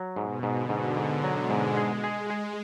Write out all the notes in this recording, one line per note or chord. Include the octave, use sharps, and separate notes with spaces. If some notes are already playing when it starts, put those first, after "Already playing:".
Already playing: F#3
G#2 B2
G#2
D3
G#2
G#2 D3
F#3
G#3
G#2
G#3 G#4
G#4
G#4